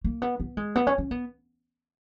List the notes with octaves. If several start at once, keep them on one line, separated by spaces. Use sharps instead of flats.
A#3
B3
B3
G#3
B3
C#4
C#4
B3